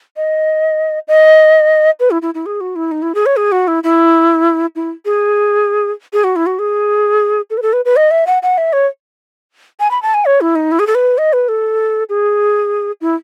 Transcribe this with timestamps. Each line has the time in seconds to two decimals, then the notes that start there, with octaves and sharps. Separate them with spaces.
0.16 D#5
1.08 D#5
2.00 B4
2.11 E4
2.22 E4
2.35 E4
2.46 G#4
2.61 F#4
2.76 E4
2.91 D#4
3.02 E4
3.15 G#4
3.26 C#5
3.37 G#4
3.52 F#4
3.68 E4
3.84 E4
4.75 E4
5.05 G#4
6.13 G#4
6.24 F#4
6.36 E4
6.46 F#4
6.59 G#4
7.50 A4
7.58 B4
7.62 A4
7.73 B4
7.85 B4
7.96 D#5
8.11 E5
8.27 F#5
8.43 F#5
8.58 E5
8.73 C#5
9.80 G#5
9.91 B5
10.02 A5
10.14 G#5
10.25 C#5
10.41 E4
10.56 D#4
10.72 E4
10.79 G#4
10.87 A4
10.95 B4
11.18 D#5
11.33 B4
11.49 A4
12.09 G#4
13.01 E4